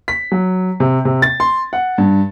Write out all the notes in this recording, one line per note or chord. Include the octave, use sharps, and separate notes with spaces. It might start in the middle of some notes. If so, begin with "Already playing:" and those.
B6
F#3
C3
C3
A6
C6
F#5
G2